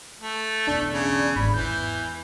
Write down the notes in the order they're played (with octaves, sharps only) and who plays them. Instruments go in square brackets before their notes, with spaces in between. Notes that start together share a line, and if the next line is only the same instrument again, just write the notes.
[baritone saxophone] A3
[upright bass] B1 E2 [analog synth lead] D4
[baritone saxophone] C#3
[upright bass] G#1 G#2 [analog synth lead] B5
[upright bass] E2 [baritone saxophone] E3 [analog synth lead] G6